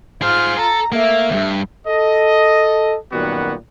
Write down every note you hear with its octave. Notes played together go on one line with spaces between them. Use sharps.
F4 G#4 C5 F6
A4 A#5
A3 A#3 E5
D2 G2
A4 D#5
F#2 A#2 D#3 G3 B3 F#4